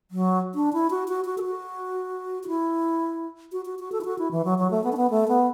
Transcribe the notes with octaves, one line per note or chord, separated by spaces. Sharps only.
F#3
D4
E4
F#4
F#4
F#4
A4
F#4
F#4
E4
F#4
F#4
F#4
A4
E4
F#4
E4
E3
F#3
F#3
A3
B3
D4
B3
A3
B3